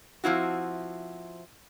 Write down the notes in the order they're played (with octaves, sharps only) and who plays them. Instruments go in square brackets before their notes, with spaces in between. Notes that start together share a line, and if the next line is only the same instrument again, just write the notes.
[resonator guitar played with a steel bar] F3 C4 E4 F#4